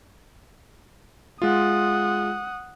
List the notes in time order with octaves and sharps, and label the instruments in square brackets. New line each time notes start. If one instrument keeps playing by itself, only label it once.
[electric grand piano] G#3 F4 [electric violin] F#5 D#6